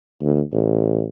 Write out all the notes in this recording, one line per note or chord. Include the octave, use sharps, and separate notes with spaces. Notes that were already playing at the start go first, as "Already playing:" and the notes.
D2
A1